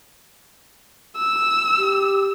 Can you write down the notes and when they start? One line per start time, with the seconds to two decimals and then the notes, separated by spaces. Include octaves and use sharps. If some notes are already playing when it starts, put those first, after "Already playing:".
1.17 E6
1.77 G4